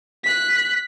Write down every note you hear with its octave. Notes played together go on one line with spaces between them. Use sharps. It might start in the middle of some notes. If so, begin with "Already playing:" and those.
F#6 B6